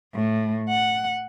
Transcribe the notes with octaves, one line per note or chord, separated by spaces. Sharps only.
A2
F#5